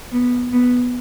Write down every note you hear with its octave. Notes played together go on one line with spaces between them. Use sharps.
B3
B3